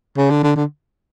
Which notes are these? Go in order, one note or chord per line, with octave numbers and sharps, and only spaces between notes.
C#3
D3
D3
D3